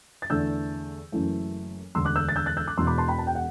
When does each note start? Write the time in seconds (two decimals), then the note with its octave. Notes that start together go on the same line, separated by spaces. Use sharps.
0.22 A6
0.30 E2 D3 A3 D4 E6 G6
1.12 F#1 F#2 E3 A3
1.95 E1 D2 D3 C6 E6
2.05 D6 F#6
2.16 E6 G6
2.29 A6
2.36 E6 G6
2.46 F#6 A6
2.57 E6 G6
2.67 D6 F#6
2.78 E1 E2 B2 C6 E6
2.87 B5 D6
2.98 A5 C6
3.08 G5 B5
3.18 A5
3.27 G5
3.35 F#5